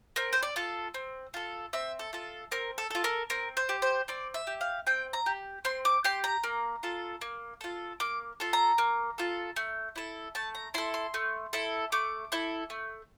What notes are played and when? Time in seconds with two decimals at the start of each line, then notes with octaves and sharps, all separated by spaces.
0.16 C4 A#4
0.33 C5
0.43 D5
0.56 F4 A4
0.94 C4
1.34 F4 A4
1.73 C4 E5
1.99 A4
2.13 F4 A4
2.51 C4 A#4
2.78 A4
2.90 F4 A4
3.04 A#4
3.30 C4 A#4
3.57 C5
3.69 G4
3.82 C5
4.08 C4 D5
4.34 E5
4.47 G4
4.61 F5
4.87 C4 G5
5.13 A#5
5.26 G4
5.65 C4 C6
5.85 D6
6.04 G4 C6
6.24 A#5
6.44 A#3
6.83 F4 A4
7.21 A#3
7.61 F4 A4
8.00 A#3 D6
8.40 F4 A4
8.53 A#5
8.78 A#3
9.18 F4 A4
9.56 A3
9.96 E4 A4
10.35 A3 A5
10.55 A#5
10.74 E4 A4 C6
10.94 C6
11.14 A3
11.53 E4 A4
11.92 A3 D6
12.32 E4 A4
12.70 A3